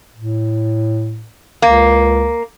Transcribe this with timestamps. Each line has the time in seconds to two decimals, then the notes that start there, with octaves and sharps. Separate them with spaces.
0.16 A2
1.62 C#2 A#3